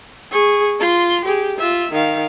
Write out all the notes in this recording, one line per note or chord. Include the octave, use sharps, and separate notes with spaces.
G#4 C#6
F4 C6
G4 G#4
F4 E5
D#3 F5